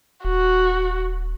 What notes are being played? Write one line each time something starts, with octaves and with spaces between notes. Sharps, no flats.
D#1 F#4